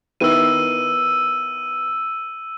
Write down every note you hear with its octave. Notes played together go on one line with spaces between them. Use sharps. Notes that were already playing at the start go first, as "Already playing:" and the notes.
D#3 B3 E4 E6 D#7